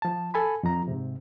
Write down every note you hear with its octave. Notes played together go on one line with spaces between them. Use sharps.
F3 A5
A4 G#5 B5
F2 F3 A#5
G#2 C3